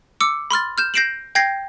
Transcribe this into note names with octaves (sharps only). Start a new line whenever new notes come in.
D6 E6 C#7
B5 C6 F6 A6
F6 G6 E7
G6 A#6 C7 D7 E7 F#7
G5 G6 G#6 A#6 C7